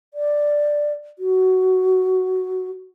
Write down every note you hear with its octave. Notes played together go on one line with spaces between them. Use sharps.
D5
F#4